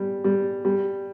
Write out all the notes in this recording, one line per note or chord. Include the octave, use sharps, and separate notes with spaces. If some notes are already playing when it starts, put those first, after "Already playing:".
Already playing: G3
G3
G3